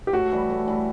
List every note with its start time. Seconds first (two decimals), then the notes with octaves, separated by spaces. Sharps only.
0.07 G4
0.13 A2 F#4
0.32 E3 G3
0.50 A2
0.67 E3 G3